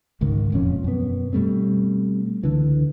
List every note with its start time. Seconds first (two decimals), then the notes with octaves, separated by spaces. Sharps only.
0.21 G#1 C#2 G#2 D#3
0.52 E1 F2 A#2 C#4
0.84 F#2 B2 B3
1.33 B2 G3 A3 C4
2.43 C#2 D3 E3